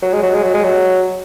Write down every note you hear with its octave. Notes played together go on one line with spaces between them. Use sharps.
F#3
G#3
F#3
G#3
F#3
G#3
F#3